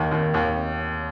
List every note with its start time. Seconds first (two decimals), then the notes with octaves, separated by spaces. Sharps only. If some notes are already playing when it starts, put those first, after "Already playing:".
Already playing: D#2 D#3
0.11 D#2
0.34 D#2